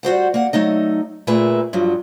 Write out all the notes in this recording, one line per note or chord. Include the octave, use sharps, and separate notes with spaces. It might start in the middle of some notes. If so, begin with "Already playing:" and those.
G3 F#4 C5 F#5
A#3 F#5
F#3 A3 D#4 D#5
A#2 A3 A#3 G#4 B4 E5
G2 F3 F#3